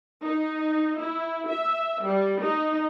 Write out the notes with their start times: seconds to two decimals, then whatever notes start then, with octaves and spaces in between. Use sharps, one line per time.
0.23 D#4
0.99 E4
1.49 E5
2.04 G3
2.41 D#4